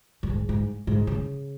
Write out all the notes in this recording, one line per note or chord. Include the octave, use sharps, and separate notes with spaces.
F#2
G#2
G#2
G#2
C#3